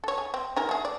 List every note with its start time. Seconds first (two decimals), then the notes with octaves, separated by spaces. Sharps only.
0.04 A4 C#5
0.18 G#4
0.34 C4
0.57 D#3 G#4 A#4
0.69 A3 G#4
0.85 D5